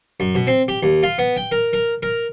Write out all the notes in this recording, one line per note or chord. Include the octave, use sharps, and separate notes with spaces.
F#2
B2
C4
G4
D#2
F4
B3
G5
A#4
A#4
A#4